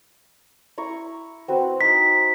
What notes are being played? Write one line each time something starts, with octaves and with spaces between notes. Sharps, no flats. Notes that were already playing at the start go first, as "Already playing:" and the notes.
E4 A#5 C#6
C4 F#4 B4
D#4 B6